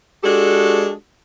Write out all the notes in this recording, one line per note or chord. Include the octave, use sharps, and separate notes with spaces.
G#3 D4 F#4 G4 A4